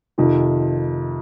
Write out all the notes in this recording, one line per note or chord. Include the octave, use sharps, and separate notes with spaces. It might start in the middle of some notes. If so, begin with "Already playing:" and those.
F2 C3 D#3